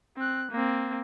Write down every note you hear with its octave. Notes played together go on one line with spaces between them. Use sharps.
C4 F#6
A#3 C4